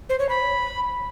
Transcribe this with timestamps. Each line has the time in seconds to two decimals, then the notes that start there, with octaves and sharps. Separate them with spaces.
0.09 C5
0.19 C#5
0.29 B5